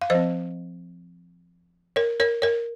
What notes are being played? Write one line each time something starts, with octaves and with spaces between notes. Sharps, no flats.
F5
F3 C4 C5 D#5
A#4 C#5
A#4 C#5
A#4 C#5